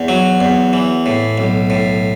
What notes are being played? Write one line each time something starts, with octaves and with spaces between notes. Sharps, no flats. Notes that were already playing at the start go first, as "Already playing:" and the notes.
Already playing: E2
F#3
E2
E3
A2
B1
A2